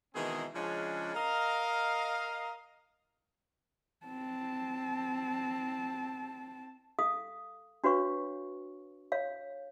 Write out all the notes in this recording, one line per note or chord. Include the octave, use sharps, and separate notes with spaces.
B2 D#3 E3 G#3 C4 G#4
C#3 F3 G#3 C#4 D4
A#4 D#5 F5
C4 A5
A4 F5 D#6
D4 F#4 B4 C#5 F5 C#6
C#5 F5